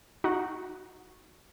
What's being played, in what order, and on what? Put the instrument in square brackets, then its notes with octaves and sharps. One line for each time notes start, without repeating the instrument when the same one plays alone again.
[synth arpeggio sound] D#4 F#4